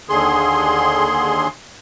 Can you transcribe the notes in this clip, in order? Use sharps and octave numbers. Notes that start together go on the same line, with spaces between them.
D#2 D3 G#4 C6